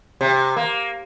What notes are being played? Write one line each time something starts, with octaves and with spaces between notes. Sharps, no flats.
C3
A#3